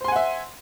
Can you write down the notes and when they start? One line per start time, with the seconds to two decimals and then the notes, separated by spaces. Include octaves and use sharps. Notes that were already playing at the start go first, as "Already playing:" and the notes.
0.01 C5
0.04 C6
0.08 G#5
0.12 F#5
0.16 E5